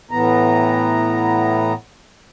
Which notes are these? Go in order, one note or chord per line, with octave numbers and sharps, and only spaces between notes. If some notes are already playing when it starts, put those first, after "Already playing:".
A2 E3 B3 A#5